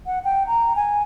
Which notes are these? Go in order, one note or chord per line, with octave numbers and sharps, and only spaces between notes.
F#5
G5
A#5
G#5